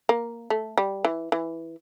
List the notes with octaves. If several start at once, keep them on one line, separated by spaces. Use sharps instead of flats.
A#3
A3
G3
E3
E3